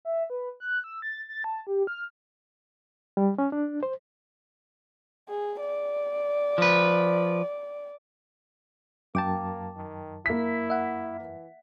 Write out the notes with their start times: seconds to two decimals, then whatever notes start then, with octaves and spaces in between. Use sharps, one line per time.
0.05 E5
0.30 B4
0.60 F#6
0.84 E6
1.02 A6
1.29 A6
1.44 A5
1.67 G4
1.87 F6
3.17 G3
3.38 C#4
3.52 D4
3.83 C5
5.29 G#4
5.60 D5
6.58 F3 B4
9.15 F#2 A#3 G5 A5 D6
9.76 D#3
10.26 A#3 E4 B6
10.70 E5 F#5
11.20 E3